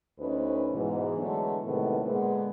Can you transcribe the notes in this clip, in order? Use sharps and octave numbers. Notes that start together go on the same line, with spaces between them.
D2 A3 C#4 D#4 B4 C5
G#2 B2 E3
D3 E3 F#3 G#3 A3 B3
A2 C3 D#3 G#3 A3 B3
A#2 D3 G#3 A#3 B3